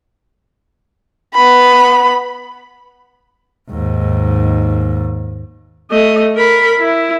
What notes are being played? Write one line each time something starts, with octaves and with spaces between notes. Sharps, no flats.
B3 B5
D#2 G#2
A3 D#5
A#4 B5
E4